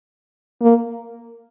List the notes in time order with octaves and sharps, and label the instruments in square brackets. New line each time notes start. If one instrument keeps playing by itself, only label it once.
[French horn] A#3